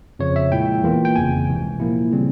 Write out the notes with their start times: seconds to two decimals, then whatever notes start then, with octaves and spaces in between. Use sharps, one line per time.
0.19 F2 C#3 F3 C#5
0.36 E5
0.52 A#2 G#3 E4 G5
0.83 E2 E3 A#3 F4
1.05 G5
1.16 G1 F2 C#3 G#5
1.48 C#2 C3 E3
1.80 A#2 F3 A#3 E4
2.12 C#3 G3 C4